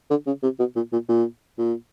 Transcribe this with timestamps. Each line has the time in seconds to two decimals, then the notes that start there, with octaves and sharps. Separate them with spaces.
0.10 D3
0.27 C#3
0.43 C3
0.59 B2
0.76 A#2
0.93 A#2
1.09 A#2
1.58 A#2